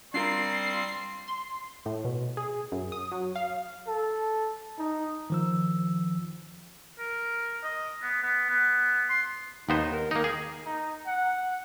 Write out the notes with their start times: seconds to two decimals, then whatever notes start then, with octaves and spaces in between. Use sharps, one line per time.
0.14 G3 C4 D4 F4 A#4 C6 C7
1.28 C6
1.86 A2
2.05 B2
2.37 G#4
2.72 F#2
2.92 D#6
3.12 F#3
3.35 F5
3.87 A4
4.79 D#4
5.30 D#3 F3 E6
6.99 A#4
7.63 D#5
8.03 B3
8.23 B3
8.50 B3
9.10 C6
9.69 D#2 B3 D#4 C5
9.93 A#4
10.11 D#3 A#3 D#4
10.24 G#4
10.66 D#4
11.07 F#5